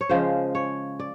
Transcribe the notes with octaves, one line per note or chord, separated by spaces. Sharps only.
C#5
C#3 F3 G#3 C5
C#5
D5